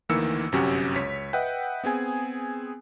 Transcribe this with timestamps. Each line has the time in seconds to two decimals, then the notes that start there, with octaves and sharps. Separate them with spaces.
0.09 D2 D#3 E3 A#3 E6 C#7
0.52 G1 F#2 C3 C#4 F#4 G4
0.96 C#2 C#5 B6
1.33 B4 D#5 E5 F#5 G5
1.84 B3 C4 G#4 G#5